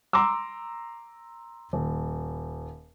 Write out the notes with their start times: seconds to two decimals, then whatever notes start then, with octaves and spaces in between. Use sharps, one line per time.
0.13 A#5 C6 D6 E6
1.73 D#1